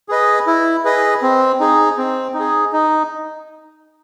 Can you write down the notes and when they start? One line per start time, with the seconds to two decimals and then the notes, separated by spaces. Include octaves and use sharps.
0.09 G#4 B4 D#5
0.47 E4
0.85 G#4 B4 D#5
1.22 C4
1.60 D#4 G#4
1.98 C4
2.34 D#4
2.40 G#4
2.73 D#4